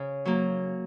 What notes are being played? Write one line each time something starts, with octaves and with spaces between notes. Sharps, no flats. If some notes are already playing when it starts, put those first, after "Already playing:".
Already playing: C#3
F#3 A#3